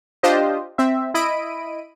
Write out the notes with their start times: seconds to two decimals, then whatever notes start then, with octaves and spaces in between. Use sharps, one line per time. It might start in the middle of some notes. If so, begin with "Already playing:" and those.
0.23 D4 F4 G4 C5 D#5
0.78 C4 E5
1.14 E4 D#5 B5 D7 D#7